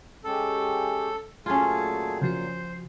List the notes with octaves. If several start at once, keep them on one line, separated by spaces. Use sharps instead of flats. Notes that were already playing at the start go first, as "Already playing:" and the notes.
G#3 C#4 G4 A4
A#2 F#3 A3 C#4 F4 G#4
C#3 F3 F#4 C5